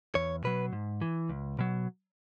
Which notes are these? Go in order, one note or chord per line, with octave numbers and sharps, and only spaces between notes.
E2 C#5
B2 F#3 B4
G#2
E3
C#2
B2 F#3